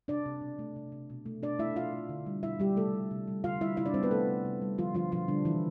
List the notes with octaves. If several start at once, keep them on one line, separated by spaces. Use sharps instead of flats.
C3 D4 D5
C3
B2
A3
C3
C3
B2
A3
B2 D4 D5
A3 E4 E5
B2 F4 F5
A3
D3
G3
B2 E4 E5
G3 G4
C3 A3 A4
G3
C3
G3
D3 F4 F5
G3 E4 E5
C3 E4 E5
D4 D5
G3 C4 C5
B3 B4
C3 A3 A4
C3
C3
G3
D3 F3 F4
D3 F3 F4
B2 F3 F4
D3 G3 D4
C3 E3 E4